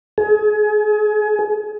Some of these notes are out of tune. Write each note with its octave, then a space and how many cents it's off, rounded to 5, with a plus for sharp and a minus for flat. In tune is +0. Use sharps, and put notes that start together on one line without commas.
G#4 +35